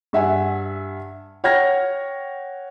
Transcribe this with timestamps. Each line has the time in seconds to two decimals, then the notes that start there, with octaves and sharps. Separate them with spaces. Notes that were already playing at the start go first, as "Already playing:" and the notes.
0.13 G2 E5 F#5 G#5
1.44 C#5 F#5 G5 F6 G#6 A#6